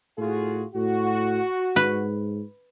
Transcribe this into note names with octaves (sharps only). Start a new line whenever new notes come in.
A2 F4 F#4 G#4
A2 F#4
G#2 B4